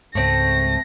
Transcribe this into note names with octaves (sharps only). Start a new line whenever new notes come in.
C#2 G#2 A3 C4 A#6